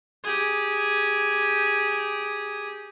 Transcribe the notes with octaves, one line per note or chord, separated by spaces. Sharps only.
G4 G#4